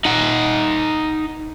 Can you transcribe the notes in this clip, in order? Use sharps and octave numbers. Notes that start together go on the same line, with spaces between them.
D#4 F#5